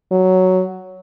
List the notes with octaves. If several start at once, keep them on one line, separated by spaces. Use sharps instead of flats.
F#3